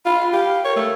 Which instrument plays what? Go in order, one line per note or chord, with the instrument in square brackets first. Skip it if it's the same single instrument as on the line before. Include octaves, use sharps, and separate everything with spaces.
[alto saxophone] F4 [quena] B5
[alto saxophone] G4 [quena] F5
[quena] A#4 [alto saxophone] C#5
[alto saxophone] A3 [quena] A#4